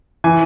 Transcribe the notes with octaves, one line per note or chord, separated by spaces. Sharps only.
E3 G#5